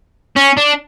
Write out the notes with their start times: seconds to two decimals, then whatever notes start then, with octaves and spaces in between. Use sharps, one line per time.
0.36 C#4
0.57 D4